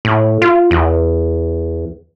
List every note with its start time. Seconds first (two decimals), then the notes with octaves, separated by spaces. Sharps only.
0.05 A2
0.42 F4
0.71 E2